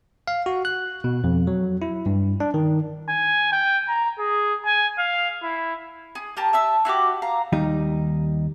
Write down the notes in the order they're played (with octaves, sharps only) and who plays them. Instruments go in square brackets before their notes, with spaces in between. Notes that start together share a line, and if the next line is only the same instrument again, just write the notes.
[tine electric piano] F5
F#4
F#6
B2
F2
F#3
E4
G2
D4
D#3
[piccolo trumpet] G#5
G5
A#5
G#4
G#5
F5
E4
[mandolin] G#4
G4 A#4 A5
E5 A5 E6
E4 F#4 G4 D6
F5 A#5
[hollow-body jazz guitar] D#2 G3 D#4